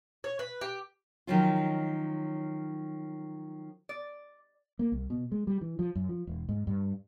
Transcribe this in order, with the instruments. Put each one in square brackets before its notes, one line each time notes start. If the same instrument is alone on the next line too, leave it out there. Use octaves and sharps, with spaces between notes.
[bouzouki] C#5
B4
G4
[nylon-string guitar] D#3 F3 F#3 C#4 F4
[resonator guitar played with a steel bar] D5
[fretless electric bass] A#3
C2
B2
G#3
G3
E3
F3
F#2
F3
E1
G#2
G2